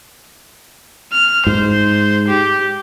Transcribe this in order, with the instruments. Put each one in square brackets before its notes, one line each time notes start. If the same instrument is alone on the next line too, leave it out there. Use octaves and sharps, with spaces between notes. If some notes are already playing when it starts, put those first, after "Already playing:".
[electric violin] F6
[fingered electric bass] G#2 [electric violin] C5
[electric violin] G4